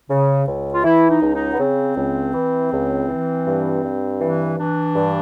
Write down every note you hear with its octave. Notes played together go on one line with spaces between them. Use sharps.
C#3
C#2
F4
E3 E4
D#4
C#2
D#4
B3
C#3 C4
C#2
E3
C#2
E3
G2
G2
E3
E3 D4
G2